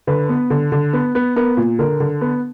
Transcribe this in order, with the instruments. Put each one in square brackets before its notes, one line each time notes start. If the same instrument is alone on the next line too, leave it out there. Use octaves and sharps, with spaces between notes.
[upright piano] D3 B4
B3
D3
D3
B3
B3
B3 A#4
A#2
D3 A#4
D3
B3